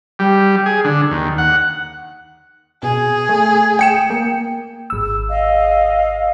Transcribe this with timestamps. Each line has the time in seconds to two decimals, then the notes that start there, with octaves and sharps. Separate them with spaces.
0.19 G3
0.66 G#4
0.85 D3
1.11 D#2
1.38 F#5
2.83 B2 G#4
3.29 A3
3.79 G5 C#7 E7
4.10 A#3
4.90 G#1 E6
5.29 D#5 F5